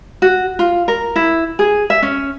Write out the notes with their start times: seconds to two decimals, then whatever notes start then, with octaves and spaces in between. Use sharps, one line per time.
0.22 F#4
0.59 F4
0.88 A#4
1.16 E4
1.59 G#4
1.90 E5
2.02 C#4